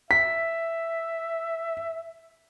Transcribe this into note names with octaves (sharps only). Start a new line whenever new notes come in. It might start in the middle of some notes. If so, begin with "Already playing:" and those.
E5 B6